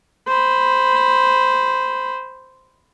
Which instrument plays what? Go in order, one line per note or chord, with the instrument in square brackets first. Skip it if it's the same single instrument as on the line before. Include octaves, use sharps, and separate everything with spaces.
[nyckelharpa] C5 B5